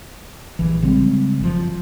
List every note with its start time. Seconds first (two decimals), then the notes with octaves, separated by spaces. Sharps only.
0.59 A#1 E3
0.82 C#3 G3 G#3 C4
1.40 F#1 F3